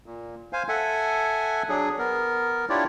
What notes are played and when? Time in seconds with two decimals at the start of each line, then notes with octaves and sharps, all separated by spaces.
0.06 A#2
0.53 C5 F5 G#5
0.69 A4 E5 F#5 G#5
1.69 F#3 D4 G#4
1.99 B3 A#4
2.69 D4 E4 F4 G4 C#5 D5